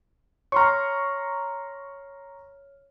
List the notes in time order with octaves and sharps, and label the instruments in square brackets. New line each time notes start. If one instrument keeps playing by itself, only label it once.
[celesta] C#5 F6 [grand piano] A#5 C6 C#6